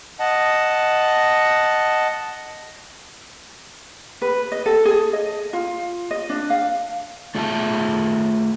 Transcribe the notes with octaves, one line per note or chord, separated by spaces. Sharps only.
D#5 F#5 A5
B4
D#5
A4
G#4
D#5
F4
D#5
D4
F5
A3 F4 G#4 E5 G#5 A5